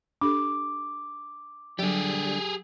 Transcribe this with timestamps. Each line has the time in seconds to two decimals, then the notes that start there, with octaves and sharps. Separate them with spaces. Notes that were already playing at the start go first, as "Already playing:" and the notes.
0.21 D4 G4 A4 D6
1.79 D3 F#3 G3 G4 G#4